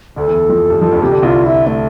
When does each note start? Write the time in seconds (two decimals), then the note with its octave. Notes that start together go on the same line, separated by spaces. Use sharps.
0.16 D2 D3 A4
0.28 E2 E3
0.49 F2 F3
0.70 G2 G3
0.81 F2 F3
0.92 D2 D3
1.03 C3 G4
1.12 D3
1.23 C2 C3 F4
1.45 E4
1.67 A3